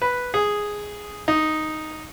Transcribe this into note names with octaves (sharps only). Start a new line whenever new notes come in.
B4
G#4
D#4